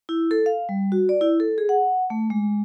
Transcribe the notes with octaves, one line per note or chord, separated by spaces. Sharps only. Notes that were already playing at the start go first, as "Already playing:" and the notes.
E4
A4
F5
G3
F#4
D5
E4
A4
G#4
F#5
A3
G#3